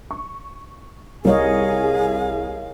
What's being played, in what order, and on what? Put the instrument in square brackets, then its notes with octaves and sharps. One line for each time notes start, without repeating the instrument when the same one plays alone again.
[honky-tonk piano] C#6
[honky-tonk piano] C2 [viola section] G#4 [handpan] A#4 C#5 D#5 [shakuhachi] F5